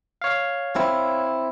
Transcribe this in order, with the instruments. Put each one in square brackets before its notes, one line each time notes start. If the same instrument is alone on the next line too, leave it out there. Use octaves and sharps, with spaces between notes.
[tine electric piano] C#5 F5
[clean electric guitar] C4 E4